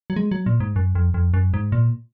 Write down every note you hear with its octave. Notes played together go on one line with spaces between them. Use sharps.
F#3
G#3
F#3
A#2
G#2
F#2
F2
F2
F#2
G#2
A#2